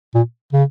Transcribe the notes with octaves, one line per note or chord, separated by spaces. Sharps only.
A#2
C#3